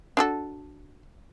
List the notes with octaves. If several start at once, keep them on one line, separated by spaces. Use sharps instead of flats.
D4 F#4 A4